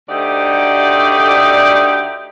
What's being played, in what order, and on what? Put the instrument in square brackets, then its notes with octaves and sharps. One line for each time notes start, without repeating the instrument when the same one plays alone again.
[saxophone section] D2 D3 A3 D#4 G4 D5